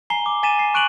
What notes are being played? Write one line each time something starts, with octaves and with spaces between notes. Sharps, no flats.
G#5 A#5 C7 G7
D6
G#5 A6 B6 D#7 E7
C7
C#6 F#6 D7 D#7 F7 F#7